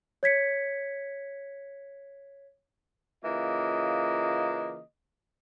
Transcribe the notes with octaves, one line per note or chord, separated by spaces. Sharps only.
C#5 G#6 B6 C#7
C#3 E3 A#3 F4 D#5